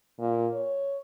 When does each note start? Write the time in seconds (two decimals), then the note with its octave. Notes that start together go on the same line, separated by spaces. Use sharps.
0.19 A#2
0.53 C#5